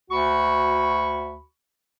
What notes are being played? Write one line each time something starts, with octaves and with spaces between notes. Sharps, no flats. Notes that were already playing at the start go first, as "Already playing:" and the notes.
D2 F#4 B5 C#6